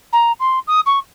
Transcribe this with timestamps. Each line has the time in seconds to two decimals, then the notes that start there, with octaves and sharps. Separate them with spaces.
0.12 A#5
0.39 C6
0.67 D#6
0.86 C#6